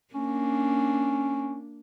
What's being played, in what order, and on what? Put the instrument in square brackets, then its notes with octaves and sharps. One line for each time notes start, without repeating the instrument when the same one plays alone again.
[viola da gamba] A#3 D4 [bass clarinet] C#4